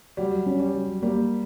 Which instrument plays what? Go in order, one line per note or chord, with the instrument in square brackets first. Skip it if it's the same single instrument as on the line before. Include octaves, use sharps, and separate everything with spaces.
[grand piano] F#3 [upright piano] G3
[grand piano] C#4
[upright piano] G3
[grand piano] F#3
[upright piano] G3 [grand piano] A#3